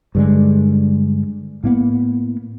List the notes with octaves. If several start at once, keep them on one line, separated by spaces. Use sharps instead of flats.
G2 D3 G#3
A2 A#3 B3